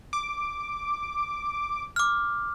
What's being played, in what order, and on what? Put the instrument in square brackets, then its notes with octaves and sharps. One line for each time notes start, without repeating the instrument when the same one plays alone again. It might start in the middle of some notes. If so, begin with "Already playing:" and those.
[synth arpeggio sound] D6
[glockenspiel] D6 F6